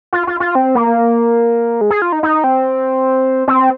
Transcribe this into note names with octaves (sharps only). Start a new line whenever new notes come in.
F4
F4
F4
C4
A#3
G#3
G#4
F4
D#4
D#4
C4
C4